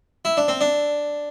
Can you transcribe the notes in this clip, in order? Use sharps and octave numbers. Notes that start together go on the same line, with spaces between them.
E4
D4
C4
D4